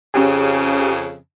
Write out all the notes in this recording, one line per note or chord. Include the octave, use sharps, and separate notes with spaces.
F2 C#3 C#4 G4 G#4